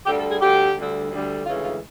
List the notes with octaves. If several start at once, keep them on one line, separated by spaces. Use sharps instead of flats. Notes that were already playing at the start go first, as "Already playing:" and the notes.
D2 D3 G3 G4
A4
G#4
D2 D3 G3 G4
D2 D3 G3
D2 D3 G3
D2 C#3 E3 G#3 F4
F4